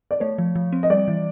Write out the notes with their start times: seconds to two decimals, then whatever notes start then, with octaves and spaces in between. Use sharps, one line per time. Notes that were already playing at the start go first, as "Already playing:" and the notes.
0.11 D5
0.20 A3 C#5
0.38 F3
0.56 F3
0.73 C4
0.83 D#5
0.90 G3 D5
1.08 E3